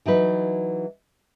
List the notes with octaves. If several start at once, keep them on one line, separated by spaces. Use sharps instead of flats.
E3 F#3 D#4 B4